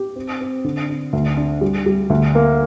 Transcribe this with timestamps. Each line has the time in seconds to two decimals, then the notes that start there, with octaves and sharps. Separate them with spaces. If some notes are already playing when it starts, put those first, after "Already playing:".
Already playing: G4
0.16 C4
0.41 C4
0.64 D3
0.89 D4
1.13 D2
1.37 D4
1.61 G3
1.86 G3
2.10 D2
2.35 A#3